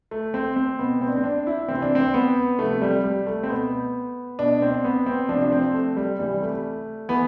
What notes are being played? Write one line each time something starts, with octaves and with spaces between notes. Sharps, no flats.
A3
C4
C4
B2 B3
C4
D4
C4
D4
E4
C3 E3 C4
D4
C4
B3
C3 F3 A3
G3
G3
A3
C4
B2 B3
B2 D4
C4
B3
C4
C3 F3 D4
D4
C4
A3
G3
C3 E3 G3
A3
E3 B3